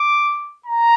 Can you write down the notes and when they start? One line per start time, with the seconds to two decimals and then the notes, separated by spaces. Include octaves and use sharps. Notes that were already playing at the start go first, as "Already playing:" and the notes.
Already playing: D6
0.66 A#5